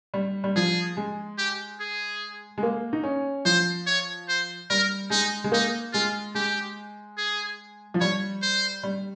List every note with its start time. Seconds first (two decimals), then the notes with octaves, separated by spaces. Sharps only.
0.14 G3
0.44 G3
0.55 F3 G#4
0.97 G#3
1.38 G4
1.80 G#4
2.58 G#3
2.63 A#3
2.93 D#4
3.03 C#4
3.45 F3 C5
3.86 C#5
4.28 C5
4.70 G3 A#4
5.10 G#3 D#4
5.44 G#3
5.52 A#3 D#4
5.93 G#3 F4
6.35 G#3 G4
7.17 G#4
7.94 F3
8.00 G3 C#5
8.42 C5
8.83 G3